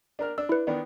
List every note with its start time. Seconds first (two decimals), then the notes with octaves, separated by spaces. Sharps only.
0.19 D4 A#4 F6
0.38 D4 E6
0.49 E4 B4
0.67 D#3 B3 D4